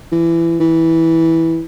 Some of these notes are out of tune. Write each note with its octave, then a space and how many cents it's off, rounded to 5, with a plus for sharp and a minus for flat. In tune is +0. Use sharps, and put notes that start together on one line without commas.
E3 +20
E3 -10